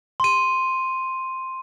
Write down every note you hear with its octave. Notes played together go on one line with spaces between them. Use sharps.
C6 D#7